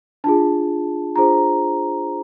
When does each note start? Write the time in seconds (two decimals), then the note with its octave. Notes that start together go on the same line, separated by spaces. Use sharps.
0.24 D4 F4 G#4 A5
1.16 D4 F4 G#4 C5 A#5